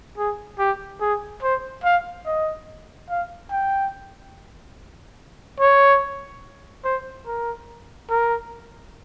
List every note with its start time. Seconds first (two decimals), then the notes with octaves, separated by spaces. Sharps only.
0.17 G#4
0.59 G4
1.01 G#4
1.43 C5
1.84 F5
2.26 D#5
3.10 F5
3.51 G5
5.60 C#5
6.85 C5
7.27 A#4
8.10 A#4